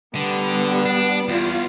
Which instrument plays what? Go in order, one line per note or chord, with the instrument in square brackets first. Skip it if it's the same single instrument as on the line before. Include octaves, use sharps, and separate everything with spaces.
[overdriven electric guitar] D3 [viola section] G3 B3
[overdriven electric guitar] D4
[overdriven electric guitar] E2 [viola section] F4